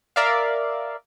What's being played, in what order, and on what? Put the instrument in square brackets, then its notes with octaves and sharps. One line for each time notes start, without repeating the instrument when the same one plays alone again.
[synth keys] A#4 D5 E5 F5